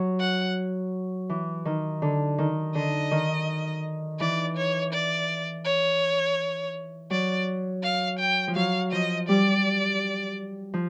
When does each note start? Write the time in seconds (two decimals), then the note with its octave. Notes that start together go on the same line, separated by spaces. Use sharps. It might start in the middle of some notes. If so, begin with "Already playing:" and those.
Already playing: F#3
0.20 F#5
1.30 E3
1.65 D#3
2.02 D3
2.38 D#3
2.75 D3 D#5
3.11 D#3
4.20 E3 D5
4.57 C#5
4.93 D5
5.65 C#5
7.10 F#3 D5
7.83 F5
8.19 G5
8.48 F3
8.56 F#3 F5
8.92 F3 D#5
9.29 G3 D5
10.74 F3